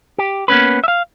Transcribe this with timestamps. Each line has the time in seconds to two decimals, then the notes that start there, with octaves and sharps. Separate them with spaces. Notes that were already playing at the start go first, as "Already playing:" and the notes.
0.18 G4
0.48 A#3 B3 C#4 B4
0.84 E5 F5